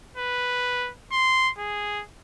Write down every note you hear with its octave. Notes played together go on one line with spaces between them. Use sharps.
B4
C6
G#4